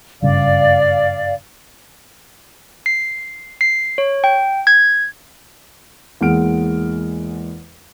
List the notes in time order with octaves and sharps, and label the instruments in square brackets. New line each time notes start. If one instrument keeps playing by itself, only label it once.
[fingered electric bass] F#1 G2 C#3 [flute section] D5 F5
[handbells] C7
C7
C#5
G5
G#6
[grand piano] E2 G#3 A#3 F#5 F6 D7